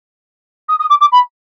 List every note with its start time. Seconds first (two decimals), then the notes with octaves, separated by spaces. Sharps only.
0.69 D#6
0.79 D#6
0.90 D6
1.01 D6
1.12 B5